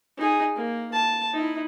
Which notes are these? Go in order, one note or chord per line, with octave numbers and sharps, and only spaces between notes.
D#4 G#4
A#3
A5
D#4 E4